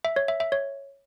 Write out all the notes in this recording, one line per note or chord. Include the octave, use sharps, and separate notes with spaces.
E5
C#5
E5
E5
C#5